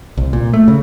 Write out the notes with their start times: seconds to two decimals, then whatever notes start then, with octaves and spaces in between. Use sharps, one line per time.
0.17 C2
0.33 A#2
0.54 A3
0.68 C#3